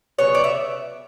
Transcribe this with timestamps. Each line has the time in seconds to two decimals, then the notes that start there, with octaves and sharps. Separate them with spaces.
0.19 C#3 F#3 B3 C#5
0.35 D5
0.44 E5